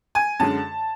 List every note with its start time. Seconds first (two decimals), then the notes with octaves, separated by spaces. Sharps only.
0.15 G#5
0.39 F#2 D3 G#3 A5